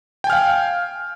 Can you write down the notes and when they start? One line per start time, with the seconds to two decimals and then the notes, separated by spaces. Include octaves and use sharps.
0.24 G5
0.27 G#5
0.30 F6
0.32 F5